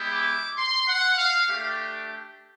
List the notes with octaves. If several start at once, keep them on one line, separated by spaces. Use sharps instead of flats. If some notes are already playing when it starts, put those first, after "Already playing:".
Already playing: G#3 B3 E4 G4
D6
C6
F#5
F5
A3 D4 G4